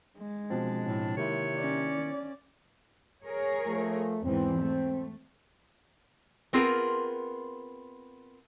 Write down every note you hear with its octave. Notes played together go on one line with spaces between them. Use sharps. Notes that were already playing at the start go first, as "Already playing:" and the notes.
G#3
B2 F3 C4 D4
A2
C3 D#3 A#3 E4 C#5
C#4 D5
G#4 A#4 C#5
F3 A3
E2 G#2 E3 C4
A3
B3 C4 F4 G#4 A#4